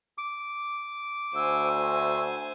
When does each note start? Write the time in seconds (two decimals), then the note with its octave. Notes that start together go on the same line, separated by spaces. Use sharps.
0.18 D6
1.35 D2 C5 G#5 E6